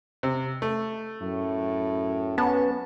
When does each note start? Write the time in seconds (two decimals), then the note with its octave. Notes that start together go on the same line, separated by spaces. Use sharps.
0.23 C3
0.62 A3
1.21 F#2 A2
2.38 B3 C#4 A5